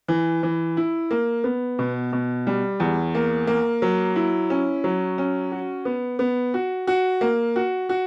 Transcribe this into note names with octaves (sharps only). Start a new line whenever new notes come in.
E3
E3
E4
A#3
B3
B2
B2
G3
E2
A#3
A#3
F#3
E4
C#4
F#3
C#4
F#4
B3
B3
F#4
F#4
A#3
F#4
F#4